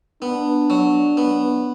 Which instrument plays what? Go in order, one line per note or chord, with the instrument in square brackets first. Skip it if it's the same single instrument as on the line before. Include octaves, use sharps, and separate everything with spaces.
[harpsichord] B3 [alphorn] D4
[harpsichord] F#3
B3